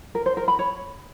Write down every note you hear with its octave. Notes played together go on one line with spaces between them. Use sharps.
A#4
C5
A#4
B5
C#5